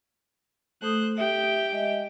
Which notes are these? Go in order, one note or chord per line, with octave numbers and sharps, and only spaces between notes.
A3 A4 C5 D#6 F#6
G4 E5 G5
G#3 D#5 E5